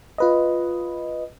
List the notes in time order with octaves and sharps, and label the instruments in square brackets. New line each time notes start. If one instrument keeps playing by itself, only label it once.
[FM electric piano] F4 B4 D#5